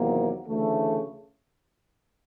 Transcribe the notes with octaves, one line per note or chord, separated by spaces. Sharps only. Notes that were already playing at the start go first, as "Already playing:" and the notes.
Already playing: E2 C3 D#3 F#3 A#3
D2 C#3 E3 A3